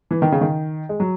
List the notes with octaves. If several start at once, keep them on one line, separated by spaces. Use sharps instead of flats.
E3
D#3
C#3
D#3
G#3
F#3